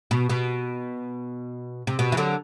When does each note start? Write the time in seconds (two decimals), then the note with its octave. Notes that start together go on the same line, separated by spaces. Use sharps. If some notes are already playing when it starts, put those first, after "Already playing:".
0.11 B2
0.30 B2
1.87 C3
1.99 B2
2.12 E3
2.17 D3 F#3